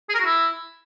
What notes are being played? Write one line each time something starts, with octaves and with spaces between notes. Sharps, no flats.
G#4
A#4
F#4
E4